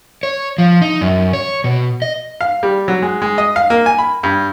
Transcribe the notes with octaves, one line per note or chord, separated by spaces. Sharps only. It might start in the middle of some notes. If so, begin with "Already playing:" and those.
C#5
F3
D#4
F#2
C#5
B2
D#5
F5
G3
F#3
G#3
G#3
D#5
F5
A#3
G#5
B5
G2